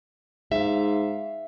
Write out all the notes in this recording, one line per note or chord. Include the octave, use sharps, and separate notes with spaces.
G#2 E5 F5